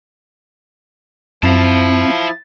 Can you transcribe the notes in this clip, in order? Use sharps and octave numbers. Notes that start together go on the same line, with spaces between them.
F#2 F3 C4 E4 F5 A5